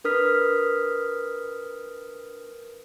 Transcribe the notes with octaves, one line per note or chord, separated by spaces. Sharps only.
D4 A#4 B4 D#6 F6 B6